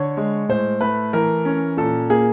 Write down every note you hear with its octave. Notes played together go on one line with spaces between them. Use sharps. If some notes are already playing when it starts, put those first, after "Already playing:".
Already playing: D3 C#5
G#3
A2 C5
A3 B4
E3 A#4
C#4
A#2 A4
A#3 G#4